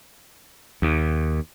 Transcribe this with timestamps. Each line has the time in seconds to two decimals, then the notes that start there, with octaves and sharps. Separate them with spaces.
0.82 D#2